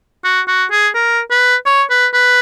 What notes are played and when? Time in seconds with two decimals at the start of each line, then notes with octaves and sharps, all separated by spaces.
0.24 F#4
0.48 F#4
0.71 G#4
0.95 A#4
1.31 B4
1.66 C#5
1.90 B4
2.14 B4